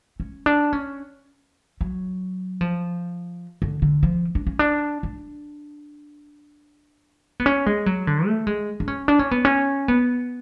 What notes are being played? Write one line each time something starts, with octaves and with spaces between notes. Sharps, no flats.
C#4
D4
C#4
F#3
F3
D3
D3
F3
D4
C#4
D4
D4
B3
C#4
G#3
F#3
D3
A3
G#3
D4
C#4
D4
C#4
B3
C#4
B3